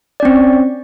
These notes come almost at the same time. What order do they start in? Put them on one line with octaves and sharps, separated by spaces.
D5 C#4 C4